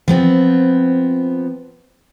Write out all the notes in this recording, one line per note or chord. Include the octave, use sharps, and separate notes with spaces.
F3 B3 C4